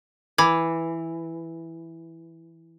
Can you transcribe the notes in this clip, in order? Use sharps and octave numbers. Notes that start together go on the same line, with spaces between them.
E3 B5 D6 G#6